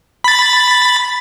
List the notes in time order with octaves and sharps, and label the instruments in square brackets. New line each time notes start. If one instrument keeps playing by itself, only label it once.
[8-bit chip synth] B5 A6